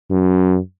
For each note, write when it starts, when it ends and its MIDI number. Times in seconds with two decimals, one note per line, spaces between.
0.11 0.58 42